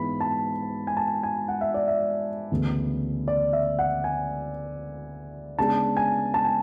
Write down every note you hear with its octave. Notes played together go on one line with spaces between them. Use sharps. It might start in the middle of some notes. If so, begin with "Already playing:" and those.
Already playing: G#2 E3 G#3 B3 E4 B5
A5
G#5
A5
G#5
F#5
E5
D5
E5
D2 C#3 E3 B3
D5
E5
F#5
G#5
C#3 G#3 B3 D4 A5
G#5
A5
G#5